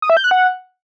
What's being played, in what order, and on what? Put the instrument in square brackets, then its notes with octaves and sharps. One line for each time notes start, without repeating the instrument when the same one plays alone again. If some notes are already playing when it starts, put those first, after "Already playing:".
[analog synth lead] D#6
E5
G6
F#6
F#5